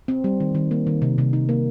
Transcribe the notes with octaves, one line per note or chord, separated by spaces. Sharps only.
C4
G3
D#3
D#3
A#3
D#3
C3
C3
D#4
A#3